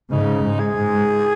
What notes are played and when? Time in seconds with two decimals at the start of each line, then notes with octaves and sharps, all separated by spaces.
0.12 G#2 C#3 D#4
0.43 G#2
0.59 G#4
0.75 G#2